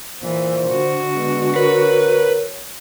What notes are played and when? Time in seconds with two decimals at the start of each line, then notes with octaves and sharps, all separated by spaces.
0.23 A#2 E3 C5
0.70 D3 F#4
1.14 G#3 B3
1.56 A#4 B4 C#5